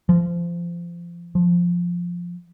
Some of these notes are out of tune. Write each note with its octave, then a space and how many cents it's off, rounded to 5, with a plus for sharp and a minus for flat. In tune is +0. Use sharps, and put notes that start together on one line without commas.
F3 -25
F3 +5